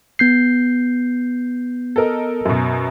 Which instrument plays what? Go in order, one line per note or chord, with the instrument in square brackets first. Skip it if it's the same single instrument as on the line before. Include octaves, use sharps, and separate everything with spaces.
[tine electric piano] B3 G6 C7
[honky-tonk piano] A4 A#4 D#5
F#2 B2